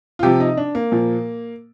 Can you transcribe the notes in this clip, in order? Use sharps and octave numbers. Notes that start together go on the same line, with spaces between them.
F4
C3 F3 G4
D#4
D4
A#3
A#2 F3